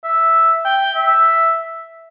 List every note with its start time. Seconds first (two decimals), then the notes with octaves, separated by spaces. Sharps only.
0.04 E5
0.65 G5
0.96 E5